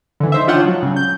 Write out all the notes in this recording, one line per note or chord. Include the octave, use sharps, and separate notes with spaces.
D3 E3
D#4 C5 E5
D4 F4 C#5 F#5 G5
F3 F#3
C#3 F#3
G6